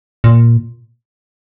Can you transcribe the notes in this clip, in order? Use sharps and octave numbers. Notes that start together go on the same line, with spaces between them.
A#2